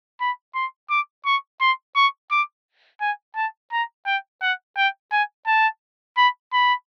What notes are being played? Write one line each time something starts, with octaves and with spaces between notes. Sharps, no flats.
B5
C6
D6
C#6
C6
C#6
D6
G#5
A5
A#5
G5
F#5
G5
G#5
A5
B5
B5